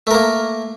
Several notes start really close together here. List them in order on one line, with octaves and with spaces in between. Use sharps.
A3 A#4 A#3